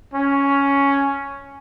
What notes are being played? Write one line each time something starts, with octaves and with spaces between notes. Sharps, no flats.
C#4